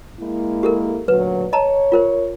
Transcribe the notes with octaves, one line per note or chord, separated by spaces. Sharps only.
G#3 A#3 E4
G4 A4 A#4
D2 A#2 F#3 B4
C#5 D#5 A5 A#5
F4 A#4 C5